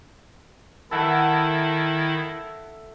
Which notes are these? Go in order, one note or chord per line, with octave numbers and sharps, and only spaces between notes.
D#3 E4 A4 E5 F#5